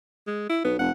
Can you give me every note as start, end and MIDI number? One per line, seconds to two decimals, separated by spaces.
0.27 0.48 56
0.49 0.60 64
0.64 0.77 35
0.64 0.78 59
0.79 0.90 29
0.79 0.92 78